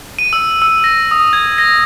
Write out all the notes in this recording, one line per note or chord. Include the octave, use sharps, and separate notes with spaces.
D#7
E6
E6
A#6
D#6
G#6
A#6